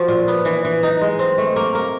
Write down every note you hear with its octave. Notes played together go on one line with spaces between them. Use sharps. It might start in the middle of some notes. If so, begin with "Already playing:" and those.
Already playing: F3 F#4
A#2
B3
E3
E3
D#4
G#3
C4
A3
A#3
A#3